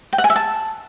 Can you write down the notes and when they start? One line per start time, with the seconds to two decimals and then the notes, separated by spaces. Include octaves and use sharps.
0.13 G5
0.18 F#5
0.24 G#5
0.30 E5
0.36 A5